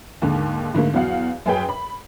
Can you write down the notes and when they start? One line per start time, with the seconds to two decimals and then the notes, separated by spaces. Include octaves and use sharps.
0.22 D#2 G#2 D3
0.74 G#2 D3 A3 A#3
0.93 E2 F#3 F5 F#5
1.46 F#2 C#4 G#4 B4 G5
1.69 B5